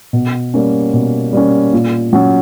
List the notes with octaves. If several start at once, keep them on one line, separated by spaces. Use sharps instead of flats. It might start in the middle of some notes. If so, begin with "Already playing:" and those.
B2
G3 A#3 C#4
B2
G3 A#3 C#4
A#2
F#3 C#4